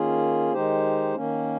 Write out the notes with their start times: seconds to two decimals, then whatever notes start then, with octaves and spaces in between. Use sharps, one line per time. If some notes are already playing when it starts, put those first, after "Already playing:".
Already playing: D#3 A#3 C#4 F4 G#4
0.52 D#3 G#3 D#4 G4 C5
1.15 D#3 A#3 C#4